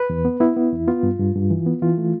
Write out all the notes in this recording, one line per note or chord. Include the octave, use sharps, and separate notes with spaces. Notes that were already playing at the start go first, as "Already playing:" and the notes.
Already playing: B4
E2
B3
B3 E4
B3
E2
B3 F4
G2
G2
G2
E3
B3
E3 F4
A3